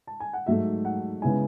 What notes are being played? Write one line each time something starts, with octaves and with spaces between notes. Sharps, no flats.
A5
G#5
F#5
G#2 F#3 A3 E5
F#5
C#3 G#3 B3 E4 G#5